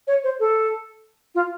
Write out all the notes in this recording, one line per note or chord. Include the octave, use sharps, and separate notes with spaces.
C#5
C5
A4
F4